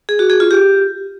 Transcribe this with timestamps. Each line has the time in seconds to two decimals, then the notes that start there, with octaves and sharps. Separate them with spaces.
0.09 G#4
0.19 F#4
0.30 G#4
0.40 F4
0.51 G4